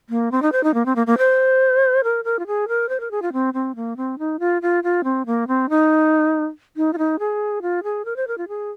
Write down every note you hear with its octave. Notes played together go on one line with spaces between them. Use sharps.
A#3
C4
D#4
C5
D#4
A#3
C4
A#3
A#3
C5
A#4
A#4
F4
G#4
A#4
C5
A#4
G#4
F4
C4
C4
A#3
C4
D#4
F4
F4
F4
C4
A#3
C4
D#4
D#4
F4
D#4
G#4
F4
G#4
A#4
C5
A#4
F4
G#4